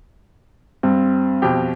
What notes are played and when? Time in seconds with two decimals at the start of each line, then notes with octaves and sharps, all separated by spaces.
0.83 G2 C4
1.42 F2 B2 G4